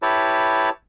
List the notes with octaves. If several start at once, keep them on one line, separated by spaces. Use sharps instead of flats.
E4 G4 B4 C#5 A5